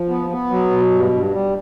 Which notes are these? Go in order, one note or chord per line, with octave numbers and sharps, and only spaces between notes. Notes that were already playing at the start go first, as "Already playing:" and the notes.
Already playing: F3
B3
B3
F#3
B2
G2
G2
G3